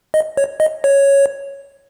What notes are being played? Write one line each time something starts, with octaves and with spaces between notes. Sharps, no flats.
D#5
C#5
D#5
C#5